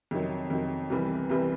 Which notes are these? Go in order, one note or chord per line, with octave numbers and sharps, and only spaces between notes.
F2 C3 D#3 F#3
F2 C3 D#3 F#3
C2 C3 E3 G3 B3
C2 C3 E3 G3 B3